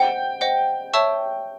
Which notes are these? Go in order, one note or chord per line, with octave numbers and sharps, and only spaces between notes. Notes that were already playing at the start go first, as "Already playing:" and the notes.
Already playing: C5 D#5 F#5 G5
C5 D#5 F#5
C#5 E5 A5 C#6 E6